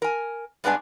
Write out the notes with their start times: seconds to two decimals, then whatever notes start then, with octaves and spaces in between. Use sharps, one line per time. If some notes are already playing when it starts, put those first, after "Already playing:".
0.02 A#4 G#5
0.64 G2 G#3 B3 D4 G#5